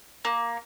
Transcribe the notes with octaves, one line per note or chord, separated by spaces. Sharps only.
A#3